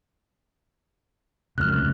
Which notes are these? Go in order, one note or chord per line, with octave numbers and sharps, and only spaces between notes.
F1 C#2 F#2 F6 F#6